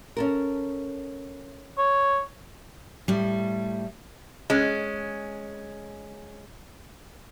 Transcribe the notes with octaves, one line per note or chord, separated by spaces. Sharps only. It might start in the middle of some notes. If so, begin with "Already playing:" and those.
C#4 A4 A#4
C#5
A2 G3
G#3 C#4